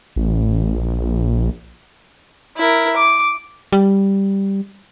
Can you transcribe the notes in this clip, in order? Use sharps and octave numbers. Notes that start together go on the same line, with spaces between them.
A1
A#1
E4 A#4
D6
G3